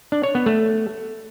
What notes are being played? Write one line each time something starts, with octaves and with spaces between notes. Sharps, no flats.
D4
C#5
B3
A3